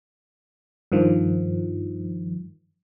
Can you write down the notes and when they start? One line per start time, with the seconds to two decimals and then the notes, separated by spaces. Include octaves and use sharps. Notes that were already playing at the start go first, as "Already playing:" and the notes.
0.92 G2 D#3 F3